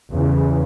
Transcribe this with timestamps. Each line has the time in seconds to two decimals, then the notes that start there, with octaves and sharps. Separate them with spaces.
0.11 E2 C#3 E3